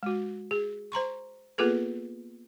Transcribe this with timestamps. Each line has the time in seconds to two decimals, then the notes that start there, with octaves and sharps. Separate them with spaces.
0.03 G#3 F#4
0.51 G#4
0.92 C5 A#5 C6 C#6
1.58 A#3 B3 F4 G#4 A4 B4